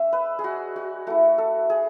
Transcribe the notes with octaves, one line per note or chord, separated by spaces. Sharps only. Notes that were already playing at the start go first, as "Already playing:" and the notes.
Already playing: G#3 D4 E5
B4
G#4
F#4
F#4
A3 E4 F#4
A4
G#4